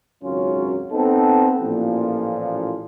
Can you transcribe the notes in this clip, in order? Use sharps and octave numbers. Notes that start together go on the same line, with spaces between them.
G#1 C#2 F#2 F#3 C#4 F4
B3 C4 D#4 A4
A1 A#2 F3